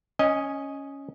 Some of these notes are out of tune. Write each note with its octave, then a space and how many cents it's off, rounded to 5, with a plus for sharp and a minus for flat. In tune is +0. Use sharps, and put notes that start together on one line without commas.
C#4 +0 D#5 +0 G#5 -30